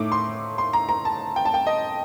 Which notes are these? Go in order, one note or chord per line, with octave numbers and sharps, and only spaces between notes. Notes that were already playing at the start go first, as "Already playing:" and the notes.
Already playing: A2 A3 D#4 D6
C6
C6
A#5
A#5
A5
G5
A5
G5
D#5